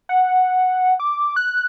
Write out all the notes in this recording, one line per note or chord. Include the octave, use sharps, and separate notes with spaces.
F#5
D6
F#6